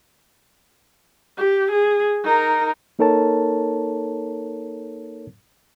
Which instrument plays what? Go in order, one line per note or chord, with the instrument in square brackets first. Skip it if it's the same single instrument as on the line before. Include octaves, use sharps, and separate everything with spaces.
[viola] G4
G#4
D#4 A#4
[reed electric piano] A#3 D#4 A4 A#4 C#5 A5